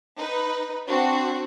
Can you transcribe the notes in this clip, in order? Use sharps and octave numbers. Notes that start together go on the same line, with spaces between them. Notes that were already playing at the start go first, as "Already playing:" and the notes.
D#4 B4
C4 D4 F#4